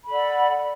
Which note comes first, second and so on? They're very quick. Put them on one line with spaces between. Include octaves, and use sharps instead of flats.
B5 A4 D5 F#5